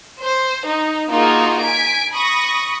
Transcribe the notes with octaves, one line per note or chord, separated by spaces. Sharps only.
C5
D#4
A#3 D#4 F4 F#4 G#4
G#5 B6 D7
B5 C#6 D#6 A#6